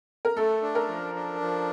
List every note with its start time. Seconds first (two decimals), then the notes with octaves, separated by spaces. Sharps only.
0.25 A#4
0.37 A3 A4
0.62 D4
0.75 A#4
0.89 F3
1.15 D4
1.41 F3